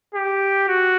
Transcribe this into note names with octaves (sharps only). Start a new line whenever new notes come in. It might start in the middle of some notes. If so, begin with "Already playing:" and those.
G4
F#4